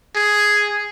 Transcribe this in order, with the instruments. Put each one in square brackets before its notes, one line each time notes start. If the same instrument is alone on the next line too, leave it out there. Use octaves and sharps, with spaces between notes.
[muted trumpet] G#4